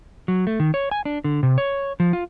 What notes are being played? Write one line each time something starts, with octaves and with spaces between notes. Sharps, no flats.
F#3
A3
D#3
C#5
G#5
D4
D3
C3
C#5
F3
F4